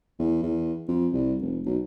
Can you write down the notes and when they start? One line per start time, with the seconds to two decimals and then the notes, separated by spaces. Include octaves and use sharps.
0.19 E2
0.42 E2
0.88 F2
1.13 C2
1.41 F1
1.66 B1